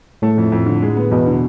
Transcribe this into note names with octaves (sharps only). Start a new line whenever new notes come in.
A2 A3
F2
F2
D3
G#3
B3
E2 B2
D3